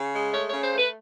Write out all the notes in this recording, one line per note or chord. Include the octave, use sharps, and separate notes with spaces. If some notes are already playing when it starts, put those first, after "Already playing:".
Already playing: C#3
G#3
A3 C#5
C#3 C#5
C5
A3 B4